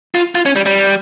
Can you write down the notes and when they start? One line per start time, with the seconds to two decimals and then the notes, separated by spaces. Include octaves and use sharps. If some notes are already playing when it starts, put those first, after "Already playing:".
0.15 F4
0.35 F4
0.46 C#4
0.56 G3
0.66 G3